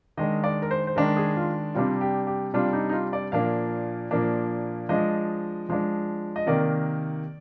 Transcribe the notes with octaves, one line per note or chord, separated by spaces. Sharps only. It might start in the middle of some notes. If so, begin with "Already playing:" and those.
D#3 G#3 D4 D#5
D5
A#4
C5
C5
D#3 G#3 D4 A#4
G#4
F4
C3 G3 D4 F4
G4
G4
C3 G3 D4 F4
D#4
D#4
F4
D5
A#2 F3 A#3 D4 F5
A#2 F3 A#3 D4
F3 G#3 D4 D#5
F3 G#3 D4
D#5
C3 D#3 A#3 D5